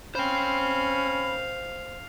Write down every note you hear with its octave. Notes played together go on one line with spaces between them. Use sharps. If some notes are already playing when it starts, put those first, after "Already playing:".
C#4 C5 F5 G5 B5